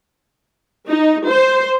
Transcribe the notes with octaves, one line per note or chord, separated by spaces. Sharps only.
D#4
C5